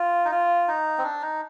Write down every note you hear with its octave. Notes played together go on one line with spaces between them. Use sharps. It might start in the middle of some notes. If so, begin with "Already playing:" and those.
Already playing: F4
D#4
F4
D#4
C4
D4
D#4